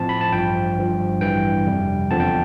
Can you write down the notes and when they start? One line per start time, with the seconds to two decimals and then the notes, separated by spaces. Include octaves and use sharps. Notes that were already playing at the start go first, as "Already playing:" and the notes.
Already playing: A2 F3 C4 A5
0.09 B5
0.21 A5
0.31 A1 G2 F3 G5
0.77 G1 G2 F3
1.21 A1 G2 E3 G5
1.66 F2 C3 G3
2.10 E2 D3 F3 C4 A5
2.20 G5